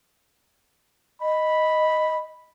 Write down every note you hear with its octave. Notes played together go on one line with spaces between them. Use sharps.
D#5 B5